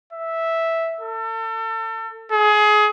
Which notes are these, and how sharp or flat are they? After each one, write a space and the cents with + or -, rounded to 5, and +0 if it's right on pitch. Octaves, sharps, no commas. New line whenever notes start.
E5 -5
A4 +35
G#4 +25